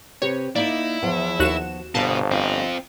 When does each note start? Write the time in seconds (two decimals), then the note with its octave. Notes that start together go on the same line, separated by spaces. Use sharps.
0.22 C3 G4 B4 C#5
0.56 A#3 D#4 E4 D5 D#5
1.03 E2 F3 B3 F#5
1.40 D#2 F#4 E7
1.95 G1 B2 C5 F5 A5
2.31 C4 F4 D#5 F5